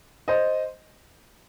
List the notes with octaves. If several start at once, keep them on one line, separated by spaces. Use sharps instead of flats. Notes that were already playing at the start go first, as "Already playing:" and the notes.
C5 D#5